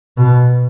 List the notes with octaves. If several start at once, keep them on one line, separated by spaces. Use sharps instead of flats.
B2